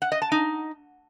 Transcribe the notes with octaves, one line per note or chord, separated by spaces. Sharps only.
F#5
D#5
A5
D#4